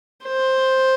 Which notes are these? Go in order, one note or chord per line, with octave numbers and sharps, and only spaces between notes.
C5